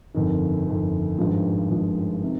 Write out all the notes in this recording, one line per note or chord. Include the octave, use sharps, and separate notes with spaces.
G1 F2 D#3
G1 F2 D#3
G#1 G2 F3 G#3
G#1 G2 F3 G#3
C3 D#3